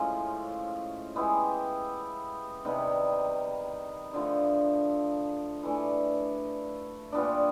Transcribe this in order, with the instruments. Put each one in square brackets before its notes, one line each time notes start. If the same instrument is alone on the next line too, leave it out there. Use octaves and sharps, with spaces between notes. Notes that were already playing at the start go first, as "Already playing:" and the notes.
Already playing: [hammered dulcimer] A2 F3 G#3 C#4
G#3 B3 E4 G4
C3 D#3 G3 B3
D3 F3 A3
E3 A3 D4
A#2 G3 B3 D4